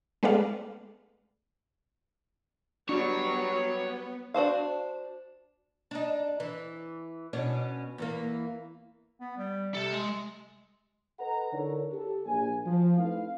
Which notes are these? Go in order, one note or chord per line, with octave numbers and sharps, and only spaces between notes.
G#3 A3 B3 B4 D5 F5
F#3 G3 B3 D4 C#5
D4 F#4 C5 F5
D4 D#4
E3
B2 C#4 D4
E2 E3 A#3
B3
G3
C3 A4 A5
G#3
A4 B4 D#5 F#5 A#5
D3 D#4 E4 A#4 C#5
G4 A4
A#1 G#5
F3
A3 C4 D#4 E4 B4 F5